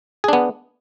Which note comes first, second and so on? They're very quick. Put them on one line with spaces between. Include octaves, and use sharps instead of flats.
G#4 D4 B3